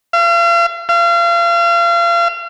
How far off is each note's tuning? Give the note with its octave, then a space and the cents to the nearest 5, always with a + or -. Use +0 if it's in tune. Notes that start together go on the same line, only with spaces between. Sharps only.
F5 -40
F5 -35